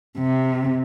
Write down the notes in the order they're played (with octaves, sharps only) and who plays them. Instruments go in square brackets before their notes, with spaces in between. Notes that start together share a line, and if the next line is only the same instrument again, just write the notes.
[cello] C3